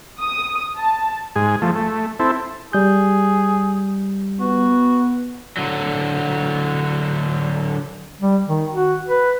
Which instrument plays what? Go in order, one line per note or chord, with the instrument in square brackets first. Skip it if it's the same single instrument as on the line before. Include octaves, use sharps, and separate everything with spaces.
[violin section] D#6
A5
[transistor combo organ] G#2 G#4
F3 A3
A3
C4 E4 A4
[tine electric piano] G3 G6 [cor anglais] G#4
[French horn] B3 [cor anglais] F#4
[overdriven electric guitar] D3 F#3
[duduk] G3
D#3
F#4
B4